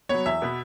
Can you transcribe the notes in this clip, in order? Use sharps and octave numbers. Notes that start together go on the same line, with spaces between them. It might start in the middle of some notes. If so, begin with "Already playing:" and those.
F#3 B3 C#5
E2 E5
B2 B3